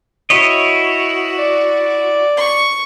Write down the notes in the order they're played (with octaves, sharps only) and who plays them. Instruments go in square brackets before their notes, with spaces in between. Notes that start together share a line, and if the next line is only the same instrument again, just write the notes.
[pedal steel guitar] E4 C#5 D#5 [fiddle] F#4
[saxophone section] D5
[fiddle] C#6